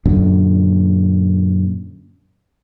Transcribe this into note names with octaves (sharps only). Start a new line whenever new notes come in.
F#2 A#2 D3